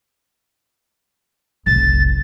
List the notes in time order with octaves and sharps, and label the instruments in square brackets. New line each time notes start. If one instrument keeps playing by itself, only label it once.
[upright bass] F1 B1 [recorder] A6